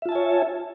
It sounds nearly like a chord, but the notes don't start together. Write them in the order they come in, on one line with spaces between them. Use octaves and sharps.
E5 F4 A5 G#5 C#5